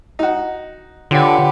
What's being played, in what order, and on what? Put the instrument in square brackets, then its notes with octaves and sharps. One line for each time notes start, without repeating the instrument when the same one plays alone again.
[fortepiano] D#4 F#4
[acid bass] D3 [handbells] F4 C#5 F#5 [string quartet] G4 B4